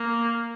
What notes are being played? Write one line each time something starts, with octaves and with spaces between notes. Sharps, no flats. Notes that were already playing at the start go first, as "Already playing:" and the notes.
Already playing: A#3